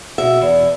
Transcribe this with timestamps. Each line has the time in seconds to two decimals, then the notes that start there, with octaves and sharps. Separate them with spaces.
0.18 B2 E5
0.41 E2